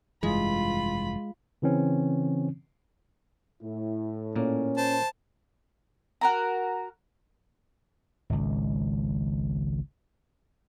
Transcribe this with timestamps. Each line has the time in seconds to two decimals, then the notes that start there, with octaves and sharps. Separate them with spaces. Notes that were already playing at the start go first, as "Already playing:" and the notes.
0.23 F1 G2 E3 G#3 F4 B5
1.62 C#3 E3 C4 C#4
3.62 A2 E4
4.36 A#2 A#3 C#4
4.77 C5 A5
6.21 F#4 A#4 A#5
8.30 G#1 C#2